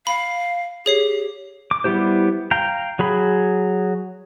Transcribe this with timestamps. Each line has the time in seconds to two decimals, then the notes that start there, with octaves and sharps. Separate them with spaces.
0.07 F5 B5
0.86 G4 G#4 C#5 C7
1.71 D6
1.84 G3 B3 E4 G4 C5
2.51 F5 G5 A#5
2.99 F#3 G#4 B5